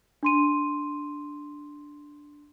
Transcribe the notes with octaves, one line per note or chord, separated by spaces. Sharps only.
D4 C6 D#7